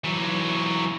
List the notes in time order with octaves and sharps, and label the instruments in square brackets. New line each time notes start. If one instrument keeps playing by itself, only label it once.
[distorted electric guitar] E3 F#3